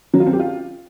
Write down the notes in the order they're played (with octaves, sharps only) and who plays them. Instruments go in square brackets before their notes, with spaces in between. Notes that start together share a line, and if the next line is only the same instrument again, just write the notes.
[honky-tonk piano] F#3
F4
C4
G4
F4